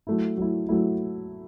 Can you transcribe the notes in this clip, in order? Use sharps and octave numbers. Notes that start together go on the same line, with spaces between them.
F#3 A3 E4
F#3 A3 E4
F#3 A3 E4